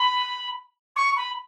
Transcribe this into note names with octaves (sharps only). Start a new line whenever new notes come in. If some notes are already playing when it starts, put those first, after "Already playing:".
Already playing: B5
C#6
B5